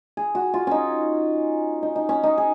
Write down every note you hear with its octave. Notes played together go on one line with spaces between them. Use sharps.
G#4
F#4
F4
C#4 D#4
D#4
D#4
C#4
D#4
G#4